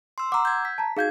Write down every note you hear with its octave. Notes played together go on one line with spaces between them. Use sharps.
C6 E6
F#5 A#5 D6 E6
G6 G#6
B6
A5 A#5
D#4 F#4 G#4 F5 G6 G#6